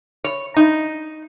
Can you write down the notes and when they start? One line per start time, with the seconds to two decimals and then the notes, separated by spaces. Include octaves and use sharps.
0.24 C#5
0.56 D#4